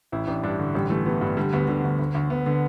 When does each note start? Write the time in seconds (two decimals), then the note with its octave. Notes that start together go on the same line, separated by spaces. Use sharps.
0.12 A1 E4
0.27 A1 D4
0.43 G2 D4
0.59 D3
0.74 A1 G3
0.90 E3 A3
1.06 E3 B3
1.21 G2
1.37 D3 G3
1.53 D2 B3
1.68 D3 G3
1.84 D2
1.99 D2
2.14 D2
2.30 D2 B3
2.46 D3 B3